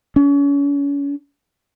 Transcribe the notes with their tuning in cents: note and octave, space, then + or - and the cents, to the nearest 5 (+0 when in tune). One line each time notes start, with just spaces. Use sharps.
C#4 +35